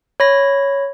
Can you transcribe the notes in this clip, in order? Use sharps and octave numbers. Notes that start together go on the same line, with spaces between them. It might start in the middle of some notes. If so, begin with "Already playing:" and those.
C#5 B5 A#6